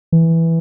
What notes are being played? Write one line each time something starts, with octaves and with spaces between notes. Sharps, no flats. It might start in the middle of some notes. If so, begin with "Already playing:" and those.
E3